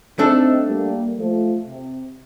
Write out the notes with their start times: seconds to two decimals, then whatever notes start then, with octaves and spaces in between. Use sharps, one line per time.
0.19 A3 C4 D4 D#4 A4
0.68 G3 A#3
1.18 F3 A3
1.67 C3